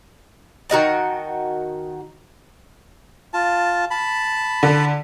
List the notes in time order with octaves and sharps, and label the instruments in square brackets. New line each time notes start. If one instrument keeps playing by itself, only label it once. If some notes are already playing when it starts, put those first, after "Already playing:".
[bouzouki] D#3 F#4 D#5 A5
[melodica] F4 A5
A5 B5
[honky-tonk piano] D3